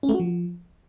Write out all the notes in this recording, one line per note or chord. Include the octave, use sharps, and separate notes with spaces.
C#4
A3
F#4
F3